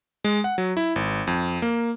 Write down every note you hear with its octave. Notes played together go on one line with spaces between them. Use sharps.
G#3
F#5
F#3
E4
G#1
F2
A#3